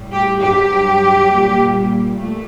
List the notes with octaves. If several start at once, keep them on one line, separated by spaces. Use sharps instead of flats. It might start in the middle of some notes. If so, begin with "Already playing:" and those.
Already playing: A2 G3
G4
G2 F#3 G4
A#2 G3
A#2 A3